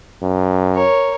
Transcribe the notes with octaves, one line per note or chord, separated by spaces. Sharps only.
F#2
A#4 C#5